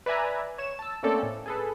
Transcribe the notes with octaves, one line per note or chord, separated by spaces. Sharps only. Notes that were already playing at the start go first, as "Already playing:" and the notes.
B4 D5 E5 G#5 A#5
C#5 E7
A5 E6
A3 A#3 C4 C#4 A4 D5
A2
G#4 A4 B4